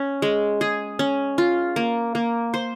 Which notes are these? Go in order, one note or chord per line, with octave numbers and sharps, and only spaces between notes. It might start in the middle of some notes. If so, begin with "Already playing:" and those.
Already playing: C#4
G#3
G#4
C#4
F4
A#3
A#3
C5